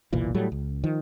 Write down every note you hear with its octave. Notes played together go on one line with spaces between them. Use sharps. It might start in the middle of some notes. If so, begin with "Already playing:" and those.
F#1 B1 A#2 E3
A2 F#3 G3 A3
C#2
D#3 F3